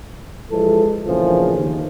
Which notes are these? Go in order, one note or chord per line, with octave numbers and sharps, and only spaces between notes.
E3 F3 G#3 A4
D2 A#2 C#3 E3 F3 G#4
D#2